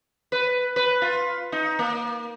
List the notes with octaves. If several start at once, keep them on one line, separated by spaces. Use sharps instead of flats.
B4
B4
F4
D#4
A#3